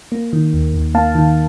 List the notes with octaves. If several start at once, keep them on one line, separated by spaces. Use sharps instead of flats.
A#3
D#3
D#2
D#2
A#3 F5 A5
D#3